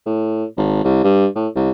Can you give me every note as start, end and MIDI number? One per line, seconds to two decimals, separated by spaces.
0.06 0.44 45
0.57 0.80 32
0.84 1.01 36
1.04 1.26 43
1.35 1.48 45
1.55 1.71 36